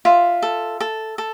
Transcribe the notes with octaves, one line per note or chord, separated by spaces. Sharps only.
F4 E5
A4
A4
A4